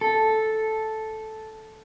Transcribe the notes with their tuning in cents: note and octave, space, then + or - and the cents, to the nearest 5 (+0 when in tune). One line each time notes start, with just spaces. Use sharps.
A4 -5